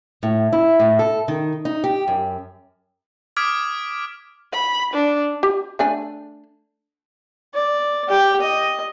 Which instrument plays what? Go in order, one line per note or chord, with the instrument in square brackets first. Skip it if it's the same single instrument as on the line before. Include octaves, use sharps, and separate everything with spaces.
[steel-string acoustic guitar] A2
E4
A2
A4
D#3
D#4
G4
F#2
[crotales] D6 D#6 F6 G#6 B6 D7
[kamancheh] B5
D4
[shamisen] G4
A3 D4 G#5
[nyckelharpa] D5
G4 G5
D#5